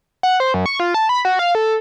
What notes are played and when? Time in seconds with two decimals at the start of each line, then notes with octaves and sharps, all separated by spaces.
0.23 F#5
0.40 C5
0.54 F#2
0.66 C#6
0.80 F4
0.94 A5
1.09 B5
1.25 F#4
1.39 F5
1.55 A4